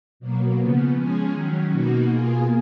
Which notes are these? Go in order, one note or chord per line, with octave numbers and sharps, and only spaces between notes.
B2 F#3 A#3
C#3 F3 B3
F3 G#3 C#4 G#4
D#3 F#3 C#4
B2 A#3 D#4 F#4
B2 A#3 F4 G#4